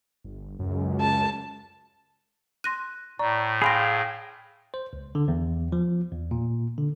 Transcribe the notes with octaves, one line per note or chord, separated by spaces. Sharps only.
G1
C#2 F#2
A5
C6 F#6 A#6 D#7
A2 D5 A#5 C#6
G#4 F5 G5 G#5 B5 C6 A#6
C5
C#2
D3
E2
F3
E2
A#2
D3